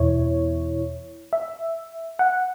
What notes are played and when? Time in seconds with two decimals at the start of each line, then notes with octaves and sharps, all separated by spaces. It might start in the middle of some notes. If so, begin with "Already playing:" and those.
Already playing: E2 B2 E4 C#5
1.33 E5
2.19 F#5